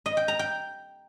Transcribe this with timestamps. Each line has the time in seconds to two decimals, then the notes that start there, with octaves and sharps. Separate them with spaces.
0.06 D#5
0.17 G5
0.28 A#5
0.39 G5